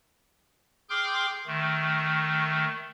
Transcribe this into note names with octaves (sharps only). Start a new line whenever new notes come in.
G#4 G5 C6 D6 F6 G6
D#3 A3